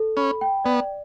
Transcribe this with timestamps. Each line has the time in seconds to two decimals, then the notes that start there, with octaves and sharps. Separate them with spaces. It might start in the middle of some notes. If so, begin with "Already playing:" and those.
Already playing: A4
0.17 C#4 B5
0.41 G5
0.64 B3 D5